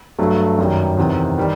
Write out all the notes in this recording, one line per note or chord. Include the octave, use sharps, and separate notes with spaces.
G2 F#3 A3
F#2 D#3 G3
E2 C3 D#3
D#3 G3